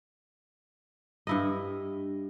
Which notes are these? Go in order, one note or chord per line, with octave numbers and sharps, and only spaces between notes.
G2 E4 D#5